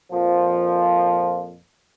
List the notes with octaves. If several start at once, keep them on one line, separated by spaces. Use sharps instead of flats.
F2 A#2 F3